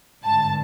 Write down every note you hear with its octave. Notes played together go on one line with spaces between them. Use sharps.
G#1 G2 D3 A5